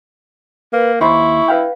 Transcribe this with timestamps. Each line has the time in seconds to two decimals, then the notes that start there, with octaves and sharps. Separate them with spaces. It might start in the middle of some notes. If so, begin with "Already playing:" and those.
0.73 A#3 B4
1.01 D#2 E4 C5 B5 C#6
1.48 B4 F5 G5